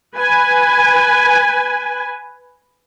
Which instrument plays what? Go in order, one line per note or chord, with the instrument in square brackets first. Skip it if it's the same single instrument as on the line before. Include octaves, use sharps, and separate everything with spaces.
[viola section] B4 G#5